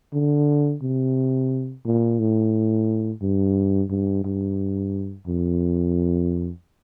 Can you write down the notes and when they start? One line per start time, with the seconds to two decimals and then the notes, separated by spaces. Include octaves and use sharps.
0.13 D3
0.82 C3
1.85 A#2
2.19 A2
3.22 G2
3.90 G2
4.24 G2
5.27 F2